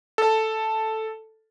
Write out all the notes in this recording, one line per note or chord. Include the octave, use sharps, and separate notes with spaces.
A4